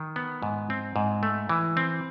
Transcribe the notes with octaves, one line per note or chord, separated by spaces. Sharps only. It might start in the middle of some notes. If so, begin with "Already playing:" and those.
Already playing: D#3
B3
G#2
C4
G#2
A3
E3
C4